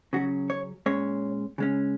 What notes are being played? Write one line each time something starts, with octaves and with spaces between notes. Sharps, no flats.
C#3 F#3 C#4 F#4
C#5
A#2 G#3 C#4 C#5
C#3 G#3 C#4